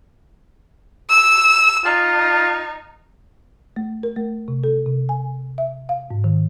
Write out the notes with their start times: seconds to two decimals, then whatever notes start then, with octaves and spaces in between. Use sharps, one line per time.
1.09 E6
1.86 D#4 F4
3.76 A3
4.03 A#4
4.16 A3
4.48 C3
4.64 A4
4.86 C3
5.09 G#5
5.58 E5
5.89 F5
6.10 G#2
6.24 D#3